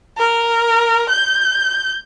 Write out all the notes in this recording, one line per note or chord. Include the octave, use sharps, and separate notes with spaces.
A#4
G6